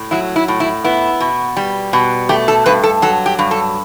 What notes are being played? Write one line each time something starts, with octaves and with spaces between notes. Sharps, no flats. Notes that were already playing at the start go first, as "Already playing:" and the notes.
Already playing: A2
F#3 E4
E4
A2
E4
B3 E4
B2
G3
B2
A3 G4
A4
G2 B4
A4
F#3 A4
G4
G2
A4